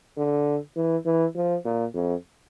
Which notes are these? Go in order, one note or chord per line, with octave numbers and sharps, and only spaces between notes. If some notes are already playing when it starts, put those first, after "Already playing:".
D3
E3
E3
F3
A#2
F2